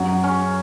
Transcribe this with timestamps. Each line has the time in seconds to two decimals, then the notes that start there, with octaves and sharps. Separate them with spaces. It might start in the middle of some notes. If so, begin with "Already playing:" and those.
Already playing: F#2 F#3
0.24 C#4